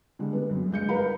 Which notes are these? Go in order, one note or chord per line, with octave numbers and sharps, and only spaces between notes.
D3 G3 G#3
B3
F#2
G2 G#3 G6 C#7
A#4 B4 F5 A#5 B5